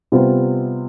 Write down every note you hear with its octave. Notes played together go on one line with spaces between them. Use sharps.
C3 G3 B3 F4 C5